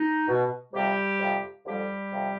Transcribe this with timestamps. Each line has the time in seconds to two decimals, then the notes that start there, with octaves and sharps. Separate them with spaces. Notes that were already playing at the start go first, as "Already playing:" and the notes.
Already playing: D#4
0.28 B2
0.73 F2 C3 F3 G3 G4
1.19 F2 C3 F3
1.66 F2 D3 F3 G3 G4
2.12 F2 C3 F3